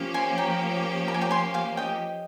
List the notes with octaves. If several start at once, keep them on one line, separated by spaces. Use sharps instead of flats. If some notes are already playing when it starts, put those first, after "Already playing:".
Already playing: F3 A#3 C#4 G4
G#5 C6
G5 A#5
A#5
G#5
G5 A#5
G#5 C6
F5 G#5
D#5 G5